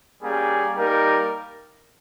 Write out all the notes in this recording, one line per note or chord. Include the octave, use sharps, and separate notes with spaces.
G3 A#3 C#4 G#4
G3 A#3 D#4 A#4